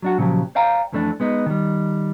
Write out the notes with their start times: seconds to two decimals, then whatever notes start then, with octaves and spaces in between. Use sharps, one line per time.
0.02 F#3 D4 F#4
0.18 A#2 C#3 F3 F#3 G4
0.55 C5 D5 F5 G5 A#5
0.93 F2 E3 A3 C4 D4
1.20 G#3 B3 D#4
1.46 D#3 G3